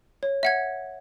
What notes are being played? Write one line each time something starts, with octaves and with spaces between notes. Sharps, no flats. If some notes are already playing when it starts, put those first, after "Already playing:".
C#5
E5 F#5 G#6